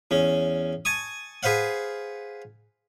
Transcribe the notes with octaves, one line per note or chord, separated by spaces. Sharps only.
E2 C#4
G#5 A5 C#6 D#6
G#4 B4 C5 F5 F#5